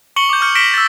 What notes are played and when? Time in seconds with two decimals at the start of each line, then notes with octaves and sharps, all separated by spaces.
0.16 C#6 C#7 F#7 G7
0.29 D6 G6
0.41 C#6 F6 G6 C#7
0.55 F6 A#6 B6 D7 E7 G7
0.74 E6 A6